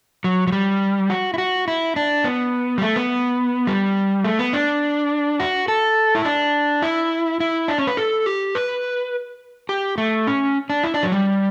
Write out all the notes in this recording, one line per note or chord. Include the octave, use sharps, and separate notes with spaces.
F#3
F#3
G3
F#4
E4
F#4
E4
D4
B3
G3
A3
B3
G3
A3
B3
D4
F#4
A4
E4
D4
E4
E4
D4
C#4
B4
A4
G4
B4
G4
A3
C#4
D4
E4
D4
F#3
G3